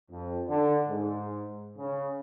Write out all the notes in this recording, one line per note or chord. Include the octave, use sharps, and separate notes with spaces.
F2
D3
G#2
C#3